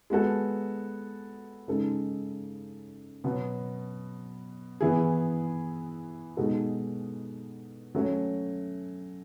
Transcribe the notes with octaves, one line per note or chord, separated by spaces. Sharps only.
G#3 B3 F#4 A4
C#3 G#3 D#4 A4
B2 F#3 B3
E3 B3 E4 G#4
B2 G#3 D#4 F#4 A4
F#3 A3 C#4